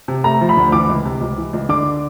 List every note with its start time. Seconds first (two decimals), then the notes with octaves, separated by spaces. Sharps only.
0.08 C3
0.24 A3 A#5
0.41 F3
0.49 B5
0.57 D2
0.72 E3 D6
0.89 C#2
1.05 C3
1.21 C#2
1.38 E3
1.53 C#2
1.69 D3 D6